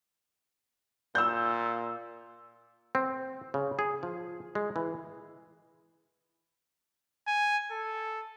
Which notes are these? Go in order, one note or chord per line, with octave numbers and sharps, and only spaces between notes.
A#2 E6 G6
C4
C#3
G#4
F3
G#3
E3
G#5
A4